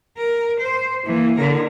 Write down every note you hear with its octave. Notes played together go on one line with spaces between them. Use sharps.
A#4
C5
E3 A#3
D3 A#4